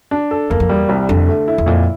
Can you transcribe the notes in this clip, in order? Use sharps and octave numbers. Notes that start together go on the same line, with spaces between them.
D4
A4
E2 A#3
F2
E2 G3
C2
F2 D3
A3
E4
E2
F2 A#2